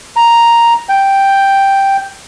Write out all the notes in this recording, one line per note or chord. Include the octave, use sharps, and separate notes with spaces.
A#5
G5